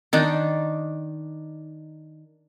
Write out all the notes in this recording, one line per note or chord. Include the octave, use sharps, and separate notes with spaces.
D#3 D4 D#4